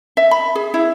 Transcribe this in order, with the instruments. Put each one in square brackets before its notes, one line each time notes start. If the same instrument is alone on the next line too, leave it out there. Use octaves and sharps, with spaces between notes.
[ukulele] E5
B5
G#4
E4